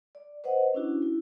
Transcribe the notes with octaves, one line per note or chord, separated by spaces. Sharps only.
D5
B4 C5 D#5 F#5
C#4 D4 E4 F#4
E4